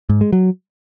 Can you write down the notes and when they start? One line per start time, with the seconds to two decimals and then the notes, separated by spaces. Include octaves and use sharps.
0.09 G#2
0.21 G#3
0.33 F#3